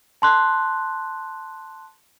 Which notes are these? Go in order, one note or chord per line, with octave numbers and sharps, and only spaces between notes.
A5 C6 F#6